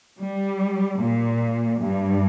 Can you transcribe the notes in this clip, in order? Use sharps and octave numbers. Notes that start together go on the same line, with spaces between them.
G3
A#2
G2